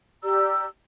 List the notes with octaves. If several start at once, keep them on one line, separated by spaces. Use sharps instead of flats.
G4 D5 A#5 E6